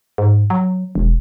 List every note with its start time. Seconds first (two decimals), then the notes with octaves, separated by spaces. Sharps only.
0.18 G#2
0.50 F#3
0.95 E1